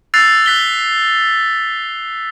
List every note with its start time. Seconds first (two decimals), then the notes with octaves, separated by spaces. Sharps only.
0.14 E6 F#6 A6 C7 F7
0.46 F#6 B6 G7